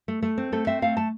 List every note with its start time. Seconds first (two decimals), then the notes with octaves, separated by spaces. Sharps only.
0.08 A3
0.22 A3
0.38 C4
0.52 A3 A4
0.67 C4 E5
0.82 A3 F5
0.97 A3 A5